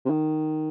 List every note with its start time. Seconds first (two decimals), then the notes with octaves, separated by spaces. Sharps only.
0.05 C3
0.10 D#3